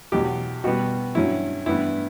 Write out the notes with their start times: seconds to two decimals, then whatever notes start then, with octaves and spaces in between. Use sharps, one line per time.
0.12 E2 B2 F#3 G4
0.64 B2 G3 B3 F#4
1.15 G2 F#3 C#4 E4
1.66 G2 E3 B3 E4